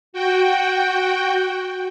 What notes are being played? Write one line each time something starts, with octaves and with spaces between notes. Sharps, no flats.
F#4 G5